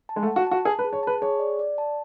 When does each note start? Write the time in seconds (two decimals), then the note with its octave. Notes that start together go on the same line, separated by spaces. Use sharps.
0.09 A5
0.16 G#3
0.23 A3
0.27 F#5
0.36 F#4
0.47 F#4 A5
0.65 G#4 A5
0.79 B4
0.84 G#4
0.93 C#5
1.03 B4 A5
1.22 G#4 C#5
1.40 D5
1.59 D5
1.78 A5